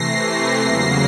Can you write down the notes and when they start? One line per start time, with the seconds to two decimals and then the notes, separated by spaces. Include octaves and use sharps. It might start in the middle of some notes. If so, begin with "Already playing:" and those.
Already playing: C3 E3 A3 A#6 C7
0.18 A#6 C7
0.59 E2 C#3 F#3 A#3